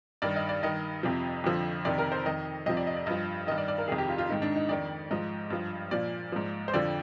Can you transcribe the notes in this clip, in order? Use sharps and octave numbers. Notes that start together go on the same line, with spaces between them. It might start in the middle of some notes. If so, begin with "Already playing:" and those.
G2 D#3 D5
D#5
D5
G2 D#3 D#5
F2 C3 F3
F2 D3 F3
F2 C3 D#3 D5
A#4
C5
F2 D#3 D#5
F2 C3 F3 D#5
D5
D#5
D5
G2 F3 D#5
G2 D#3 D#5
D5
D5
A#4
F2 C3 D#3 G#4
G4
F4
F4
G#2 D#3 D#4
D4
D#4
F2 D#3 D5
G#2 F3 D#5
G2 F3
A#2 F3 D5
G#2 F3
C5
F2 D3 F3 D5